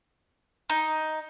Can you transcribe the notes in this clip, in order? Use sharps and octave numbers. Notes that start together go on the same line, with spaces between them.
D#4